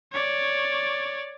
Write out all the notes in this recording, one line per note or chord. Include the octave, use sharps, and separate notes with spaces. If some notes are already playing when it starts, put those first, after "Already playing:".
C#5 D5